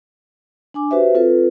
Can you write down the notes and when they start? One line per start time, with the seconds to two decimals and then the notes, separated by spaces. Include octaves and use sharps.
0.74 D4 G#5 D6
0.91 F#4 G4 B4 C5 E5
1.14 C4 F4 A4 B4